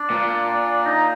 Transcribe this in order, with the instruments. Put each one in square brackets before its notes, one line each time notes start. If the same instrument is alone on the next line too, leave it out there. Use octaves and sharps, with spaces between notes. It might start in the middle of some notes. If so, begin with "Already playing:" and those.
Already playing: [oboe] D4
[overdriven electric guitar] A#2
[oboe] D#4